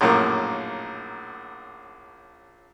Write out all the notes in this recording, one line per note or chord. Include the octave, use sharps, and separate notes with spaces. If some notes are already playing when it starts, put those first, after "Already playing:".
A#1 F#2 A2 A#3